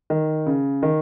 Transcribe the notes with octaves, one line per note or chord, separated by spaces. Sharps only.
D#3
C#3
D#3